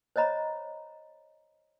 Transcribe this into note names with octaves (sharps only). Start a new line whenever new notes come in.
C5 C#5 D#5 A#5 B5